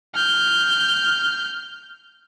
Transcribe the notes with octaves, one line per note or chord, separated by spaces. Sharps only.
F6 G6